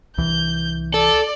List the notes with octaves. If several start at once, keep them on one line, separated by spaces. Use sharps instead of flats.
C2 E3 G6
A4 D5